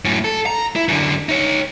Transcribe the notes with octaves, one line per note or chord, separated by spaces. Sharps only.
F#2 A2
A4
A#5
E4
F#2 D3
D#4 C#5